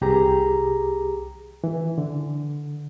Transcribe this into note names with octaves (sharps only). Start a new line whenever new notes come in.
C2 G4 G#4 A#5
E3
D3